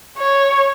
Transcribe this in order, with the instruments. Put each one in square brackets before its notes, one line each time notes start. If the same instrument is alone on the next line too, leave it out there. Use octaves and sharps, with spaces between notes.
[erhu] C#5